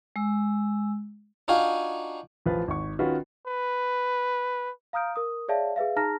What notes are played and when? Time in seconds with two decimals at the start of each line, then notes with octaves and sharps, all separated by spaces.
0.16 G#3 E6
1.48 D4 D#4 F4 F#4 F5 G#5
2.46 A1 F3 F4 B4
2.68 G#1 C#6
2.99 D#3 C#4 F4 F#4 B4
3.47 B4
4.93 F5 A#5 D#6 F6 G6 D7
5.16 A#4 D#6
5.48 G#4 C#5 D5 E5 F5 A5
5.76 G#4 B4 E5 F5
5.96 D#4 G#4 A5 A#5 F6 A#6